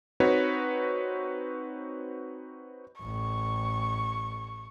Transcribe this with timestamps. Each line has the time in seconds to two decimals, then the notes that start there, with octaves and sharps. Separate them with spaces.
0.20 C4 D#4 F#4 B4 C#5
3.02 A1 C#6